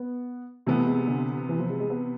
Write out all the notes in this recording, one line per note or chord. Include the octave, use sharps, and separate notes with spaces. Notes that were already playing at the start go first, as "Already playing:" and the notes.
Already playing: B3
C3 E3 A3 B3
G#3
D3
E3
F3
G#3
G#3
B3